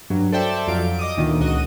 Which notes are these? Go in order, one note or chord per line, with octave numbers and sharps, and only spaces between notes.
G2 F#3
A4 C5 D5 E5 G5 A5
F2 F#3 F5 D7
D#5 D6 D#6
D2 A#2 D#3
C#2 F#4 D#5 D#7